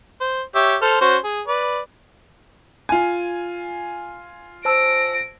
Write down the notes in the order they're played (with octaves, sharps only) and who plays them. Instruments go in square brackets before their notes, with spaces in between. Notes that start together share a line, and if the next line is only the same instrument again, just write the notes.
[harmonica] C5
G4 C#5 E5
A4 C5 F6
C#4 F#4 C5
G#4
B4 D5
[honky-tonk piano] F4 G#5
[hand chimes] C5 A5 E6 [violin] A#6 D7